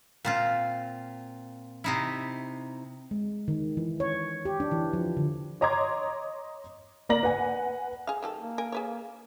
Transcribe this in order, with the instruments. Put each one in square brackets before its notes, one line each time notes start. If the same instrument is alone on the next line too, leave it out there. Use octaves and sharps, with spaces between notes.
[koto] A#2 C4 F4
C3 D#4 E4
[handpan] G#3
D#3
E3
C#5
G4
D4
E3
F3
D3
[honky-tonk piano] C#5 D#5 A#5 C6 D6 G#6
A#3 D5 A#5 A#6 F#7
B4 F#5 G#5
[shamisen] G#4 F5
D#3 G3 A4
[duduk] A#3
[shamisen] A#4 G#5
G#4 B4 C#5